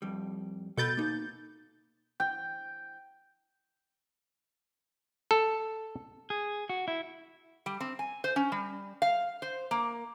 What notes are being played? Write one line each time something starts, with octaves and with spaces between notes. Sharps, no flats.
F2 G3
B2 A4 B5 G6 A6
A#3 D#4
G5
A4
G#4
F#4
E4
G3
C4
G#5
C5
C#4
G3
F5
C5
A#3